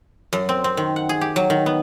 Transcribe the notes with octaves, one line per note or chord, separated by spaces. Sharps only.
F#2
C4
C4
D#3
F#5
G#4
G4
F#3
D#3
B3